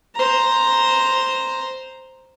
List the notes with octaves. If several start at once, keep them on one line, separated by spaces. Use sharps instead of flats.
C5 A#5